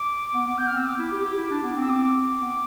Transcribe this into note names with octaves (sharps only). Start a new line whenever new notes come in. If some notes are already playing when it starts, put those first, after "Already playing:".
Already playing: D6
B3
B3
B3 G6
F6
C4 E6
D6
E4
G4
G4
E4
D4
B3
C4
E6
D6
B3